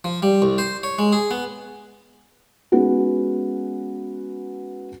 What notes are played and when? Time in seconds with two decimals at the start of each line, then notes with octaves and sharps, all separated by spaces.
0.04 F3
0.22 G3
0.42 C2
0.58 C5
0.83 C#5
0.98 G#3
1.12 G#4
1.31 B3
2.72 G#3 B3 C#4 D#4 F#4